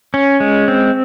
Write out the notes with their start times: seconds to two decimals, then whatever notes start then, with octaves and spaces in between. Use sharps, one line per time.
0.14 C#4
0.40 G#3
0.68 C4